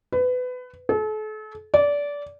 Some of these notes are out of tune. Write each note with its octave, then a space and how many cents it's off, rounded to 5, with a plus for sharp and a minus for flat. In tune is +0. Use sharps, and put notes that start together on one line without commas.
B4 +25
A4 -40
D5 -20